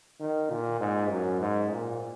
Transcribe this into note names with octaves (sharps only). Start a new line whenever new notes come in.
D#3
A#2
G#2
F#2
G#2
A#2